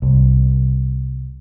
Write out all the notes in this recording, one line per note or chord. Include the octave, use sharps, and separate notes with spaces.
C2